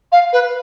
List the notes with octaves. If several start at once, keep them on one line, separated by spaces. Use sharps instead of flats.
F5
B4